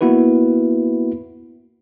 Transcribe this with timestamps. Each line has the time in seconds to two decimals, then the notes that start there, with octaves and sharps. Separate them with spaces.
0.01 A#3 B3 E4 F#4 B4